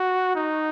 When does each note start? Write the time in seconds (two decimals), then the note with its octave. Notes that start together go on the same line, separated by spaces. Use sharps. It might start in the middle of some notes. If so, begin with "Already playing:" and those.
Already playing: F#4
0.36 D#4